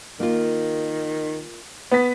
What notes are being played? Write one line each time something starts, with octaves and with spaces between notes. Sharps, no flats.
D#3 A#3 F4
B3 B6